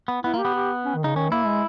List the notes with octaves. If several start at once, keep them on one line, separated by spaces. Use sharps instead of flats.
B3
B3 E4
A#3
G4
B3
G4
C#4
D#3
C#3 D#4
D#3 C#4
A#3 E4
G#3